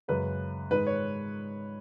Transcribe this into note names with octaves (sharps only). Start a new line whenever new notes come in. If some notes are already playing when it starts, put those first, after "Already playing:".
F#2 C#3 G#3 B4
G#2 D#3 G#3 B4
C#5